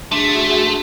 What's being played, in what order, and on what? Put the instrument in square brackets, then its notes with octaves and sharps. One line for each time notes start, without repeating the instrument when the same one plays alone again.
[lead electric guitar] A3 [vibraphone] D4 C6 [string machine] F#4 G#4 E5